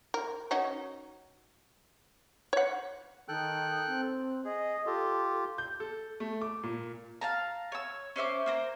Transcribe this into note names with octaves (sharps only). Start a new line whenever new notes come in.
A#4
C#4 D#4 F#4
C#5 F#5
D#3 A4 G5 F#6
C4
G#4 D#5
F4 G4 A4
G6
A4
A3
D6
A#2
F5 A5 A#5
C#5 E6
C#4 C5 E5 D6
A#3 C5 A#5